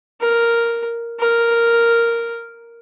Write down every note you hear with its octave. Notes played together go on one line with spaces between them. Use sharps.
A#4
A#4